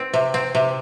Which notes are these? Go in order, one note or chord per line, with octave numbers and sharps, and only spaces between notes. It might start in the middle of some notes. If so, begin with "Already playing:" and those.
Already playing: C4
C3
C4
C3